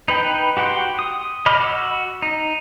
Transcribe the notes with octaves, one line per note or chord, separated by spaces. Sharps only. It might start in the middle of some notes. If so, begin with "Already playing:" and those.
D#4 B4 G5
F#4 G4 F#5 G5 C6
D#6
D#5 B5 D6 F6
F#4 E6
D#4